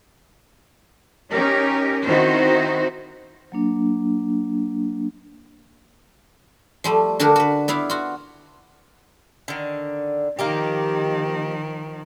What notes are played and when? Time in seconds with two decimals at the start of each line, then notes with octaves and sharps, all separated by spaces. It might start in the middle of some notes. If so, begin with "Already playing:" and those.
1.31 C#4 D#4 G4 A#4
2.06 D#3 C4 D#4 E4 F#4 C5
3.52 F#3 A#3 D4
6.84 F3 G3 A3
7.19 D3 D4 F#4 G4 A#4
7.36 F#4 B4
7.68 B3 E4 D5 F5
7.90 F4 F#4
9.48 D3 D#3
10.39 D#3 F3 A#3 D#4 G4